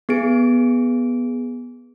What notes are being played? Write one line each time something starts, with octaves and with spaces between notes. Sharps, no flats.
B3 G#4 D7